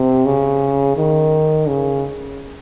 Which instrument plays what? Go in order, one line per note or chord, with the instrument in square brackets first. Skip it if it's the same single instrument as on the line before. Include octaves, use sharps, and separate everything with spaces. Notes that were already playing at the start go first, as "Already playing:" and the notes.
Already playing: [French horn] C3
C#3
D#3
C#3